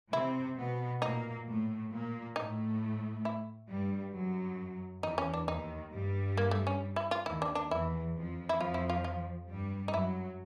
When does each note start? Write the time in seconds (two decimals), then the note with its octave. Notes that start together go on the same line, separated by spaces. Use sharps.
0.12 C3 C4 E4
0.57 B2 B3
1.02 A#2 A#3 D#4
1.47 A2 A3
1.91 A#2 A#3
2.36 A2 A3 D#4
3.25 E4
3.69 G2 G3
4.14 F#2 F#3
5.03 E2 E3 D#4
5.18 C#4
5.34 D4
5.48 D#2 D#3 D#4
5.92 G2 G3
6.37 A#3
6.51 A3
6.67 C#4
6.96 E4
7.11 F4
7.26 D#2 D#3 E4
7.42 D4
7.55 D4
7.71 E2 E3 E4
8.15 F2 F3
8.49 E4
8.59 F2 F3 F4
8.74 E4
8.90 F4
9.04 F4
9.49 G2 G3
9.88 D#4
9.94 F#2 F#3 E4